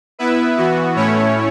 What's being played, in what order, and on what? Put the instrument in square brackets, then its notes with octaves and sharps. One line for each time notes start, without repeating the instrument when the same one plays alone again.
[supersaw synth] B3 E4 B4 E5
E3 B3 F#4
A2 A3 C#4 E4 C#5